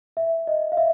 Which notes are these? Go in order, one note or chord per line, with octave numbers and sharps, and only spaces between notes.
E5
D#5
F5
E5